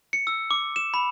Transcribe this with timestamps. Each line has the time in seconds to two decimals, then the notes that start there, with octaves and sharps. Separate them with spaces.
0.13 C#7
0.27 E6
0.51 D6
0.76 E7
0.94 B5